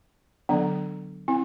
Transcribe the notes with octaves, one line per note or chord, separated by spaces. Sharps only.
D3 F#3 B3 D4
C4 E4